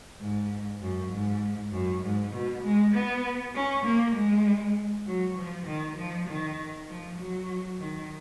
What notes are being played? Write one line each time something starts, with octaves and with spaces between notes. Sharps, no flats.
G#2
F#2
G#2
F#2
G#2
B2
G#3
B3
C#4
A#3
G#3
F#3
F3
D#3
F3
D#3
F3
F#3
D#3